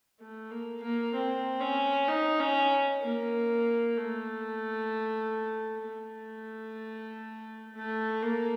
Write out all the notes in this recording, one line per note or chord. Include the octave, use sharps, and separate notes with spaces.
A3
A#3
A#3
C4
C#4
D#4
C#4
A#3
A3
A3
A3
A#3